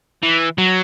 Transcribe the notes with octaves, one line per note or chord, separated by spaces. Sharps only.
E3
F#3